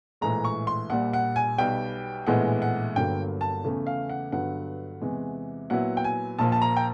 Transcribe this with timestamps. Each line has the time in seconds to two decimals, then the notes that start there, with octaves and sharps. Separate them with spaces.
0.21 A#1 A2 E3 G#3 A#5
0.44 C#6
0.67 C6
0.90 A#1 A#2 G3 F#5
1.13 F#5
1.36 G#5
1.58 B1 B2 G3 B3 G5
2.27 A#1 A2 E3 G#3 B3 F#5
2.62 F#5
2.96 G1 G2 D3 F#3 A#3 G5
3.41 A5
3.64 E2 C#3 E3 A3
3.86 F5
4.09 F#5
4.32 G2 D3 F#3 B3 F#5
5.01 E2 C3 E3 G#3
5.70 A#2 F#3 B3 E4 F#5
5.97 G5
6.04 G#5
6.38 A#1 A#2 F3 A#3 A5
6.52 A5
6.62 A#5
6.77 G5